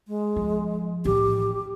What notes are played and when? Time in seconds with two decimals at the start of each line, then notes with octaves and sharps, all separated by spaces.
0.08 G#3
0.36 F3
1.05 A1 G4